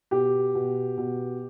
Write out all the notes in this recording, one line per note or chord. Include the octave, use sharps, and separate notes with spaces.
B2 G4
B2
B2